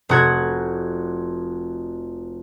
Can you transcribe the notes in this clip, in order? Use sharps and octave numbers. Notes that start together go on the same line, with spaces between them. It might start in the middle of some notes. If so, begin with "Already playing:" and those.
F1 F#4 G#6